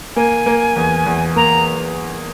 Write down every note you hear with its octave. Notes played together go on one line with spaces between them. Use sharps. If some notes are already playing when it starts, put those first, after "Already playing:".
A#3 G#5
A#3
E2
E2
A#3 A#5